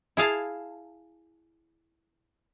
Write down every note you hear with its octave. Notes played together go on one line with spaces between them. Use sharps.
E4 G#4 F5 A5